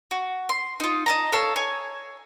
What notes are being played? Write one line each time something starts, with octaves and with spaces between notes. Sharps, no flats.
F#4
C6
D#4 F4
D#5 A5 A#5
A4 C#5 F5 A5
C#5 G#5